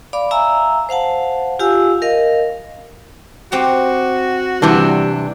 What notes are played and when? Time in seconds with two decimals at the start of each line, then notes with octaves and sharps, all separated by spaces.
0.13 D5 F5 B5 D6
0.31 E5 F5 G#5 A#5 E6
0.89 C5 F5 F#5 A5
1.59 F4 G4 F5 G#5 E6
2.02 A#4 D#5 F5
3.52 C4 F#4 G4 A#5
4.62 C3 E3 G3 D4